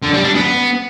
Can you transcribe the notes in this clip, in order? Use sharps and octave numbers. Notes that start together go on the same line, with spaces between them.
D3
G3
D4
B3